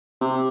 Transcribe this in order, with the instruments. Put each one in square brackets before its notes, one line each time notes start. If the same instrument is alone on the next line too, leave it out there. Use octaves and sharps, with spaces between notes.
[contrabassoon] C3